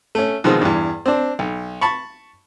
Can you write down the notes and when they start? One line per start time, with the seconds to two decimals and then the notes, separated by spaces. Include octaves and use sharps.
0.15 A3 C#4
0.44 B2 D#3 F3 G#3 C4
0.61 E2 G2
1.06 C4 D4
1.39 B1
1.81 A5 B5 C#6